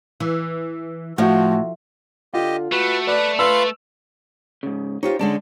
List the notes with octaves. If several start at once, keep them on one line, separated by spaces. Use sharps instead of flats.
E3
A2 F3 F#4
D3 F4 G4 D#5
A3 F#4 B4
B4 D5
F4 B4 F5 B5 E6
G#2 C#3
D#4 F4 G4 C5 C#5
D3 G#3 C#4 D5 A5